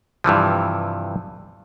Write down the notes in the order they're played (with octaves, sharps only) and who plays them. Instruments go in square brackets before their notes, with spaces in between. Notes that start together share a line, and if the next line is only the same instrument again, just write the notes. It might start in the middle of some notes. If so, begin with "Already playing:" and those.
[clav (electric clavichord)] G2 C3 E3 F3